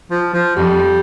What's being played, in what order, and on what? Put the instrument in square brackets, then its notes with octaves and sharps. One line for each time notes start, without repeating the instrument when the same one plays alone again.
[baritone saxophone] F3
F3
[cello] F2 [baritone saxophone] G3